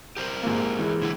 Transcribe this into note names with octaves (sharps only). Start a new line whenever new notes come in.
G4 A#4 C5
A#1 G#2 A#3
E3 G#3
A2 D3 E4